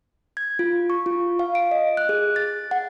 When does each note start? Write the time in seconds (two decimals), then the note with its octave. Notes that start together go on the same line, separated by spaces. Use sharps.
0.37 G#6
0.59 F4
0.90 C#6
1.06 F4
1.39 F5
1.55 D7
1.71 D#5
1.97 F#6
2.09 G#4
2.36 A6
2.71 F#5